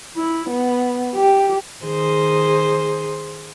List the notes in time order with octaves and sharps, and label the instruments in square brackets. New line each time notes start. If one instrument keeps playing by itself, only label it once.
[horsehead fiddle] E4
B3
G4
[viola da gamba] D#3 G#4 C5